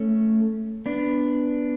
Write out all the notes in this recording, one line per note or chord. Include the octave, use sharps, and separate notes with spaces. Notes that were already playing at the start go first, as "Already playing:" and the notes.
Already playing: A3 C#4
B3 D4